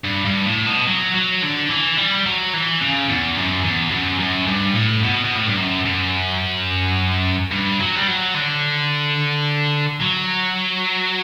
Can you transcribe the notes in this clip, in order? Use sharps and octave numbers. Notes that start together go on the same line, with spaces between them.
G2
G2
A2
B2
F#3
F#3
D3
E3
G3
F#3
E3
C#3
E2
F#2
E2
F#2
F#2
G2
A2
B2
B2
A2
G2
F#2
F#2
G2
F#3
G3
F#3
D3
F#3